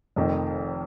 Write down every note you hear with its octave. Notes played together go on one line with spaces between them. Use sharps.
F1 F2 D#3 D#5